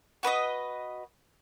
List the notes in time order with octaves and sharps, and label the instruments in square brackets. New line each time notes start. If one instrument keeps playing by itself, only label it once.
[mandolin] F#4 B4 D5 D#5